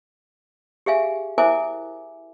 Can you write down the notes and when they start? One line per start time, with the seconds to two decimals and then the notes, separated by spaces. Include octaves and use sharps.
0.86 G4 G#4 E5 F5 G#5
1.38 E4 A#4 C5 E5 G#5 D6